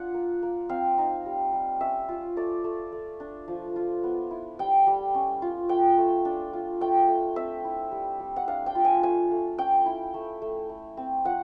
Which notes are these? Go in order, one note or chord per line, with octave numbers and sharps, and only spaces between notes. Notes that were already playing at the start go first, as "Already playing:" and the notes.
Already playing: D4 F4 F#5
A#3
A#3
C4 F5
D#4
G3
G3
C#4 E5
F4
A3 D5
A3
A3
D4
F3
F4
B3
E4
G3 G5
G3
C#4
F4
A3 G5
A3
D4
F4
A3 G5
A3
C4 E5
E4
G3
G3
F#5
D4 F5
G5
F4
G#5
A3 G#5
A3
C#4 G5
E4
A3
A3
A3
C4
F3 F#5